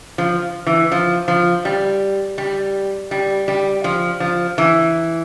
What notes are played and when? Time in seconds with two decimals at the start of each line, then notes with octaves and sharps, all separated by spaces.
0.18 F3
0.67 E3
0.92 F3
1.28 F3
1.65 G3
2.38 G3
3.11 G3
3.48 G3
3.84 F3
4.20 F3
4.58 E3